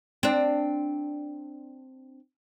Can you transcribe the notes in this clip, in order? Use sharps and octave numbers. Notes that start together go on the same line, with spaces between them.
C4 D4